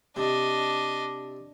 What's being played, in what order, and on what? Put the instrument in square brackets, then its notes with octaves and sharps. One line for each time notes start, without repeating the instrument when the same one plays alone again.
[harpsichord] C3 [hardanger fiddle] D4 D#5